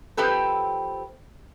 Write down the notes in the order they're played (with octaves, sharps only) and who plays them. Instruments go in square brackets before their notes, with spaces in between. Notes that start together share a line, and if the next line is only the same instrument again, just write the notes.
[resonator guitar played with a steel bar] F3 C4 G4 A4 B4